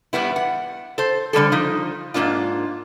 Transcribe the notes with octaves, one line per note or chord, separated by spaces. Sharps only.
E2 G3 B3 E4
F#5
A4 C5
D3 G3 G4 A4
F3 D#4
G#2 C#3 A#3 D4 F4